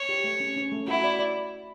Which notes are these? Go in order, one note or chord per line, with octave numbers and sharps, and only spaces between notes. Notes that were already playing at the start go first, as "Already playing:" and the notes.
Already playing: C#5
G4
A3
C#4
C#4
A3
E4 F#4
D5
D5